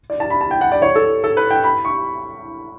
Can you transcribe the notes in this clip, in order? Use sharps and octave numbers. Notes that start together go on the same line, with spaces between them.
D5
A5
B5
A5
G5
F#5
D5
C#5
A4
A4
B4
G5
B5
C#6